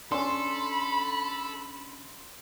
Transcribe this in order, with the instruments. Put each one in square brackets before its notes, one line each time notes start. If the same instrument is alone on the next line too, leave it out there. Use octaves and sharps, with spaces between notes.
[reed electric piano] C#4 D4 [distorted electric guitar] A4 [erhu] B5 [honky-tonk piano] C6